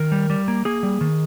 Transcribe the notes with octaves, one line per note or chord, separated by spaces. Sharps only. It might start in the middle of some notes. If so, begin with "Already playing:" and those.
Already playing: D#3 A#4
G3
G3
A#3
A#3 G#4
G3
D#3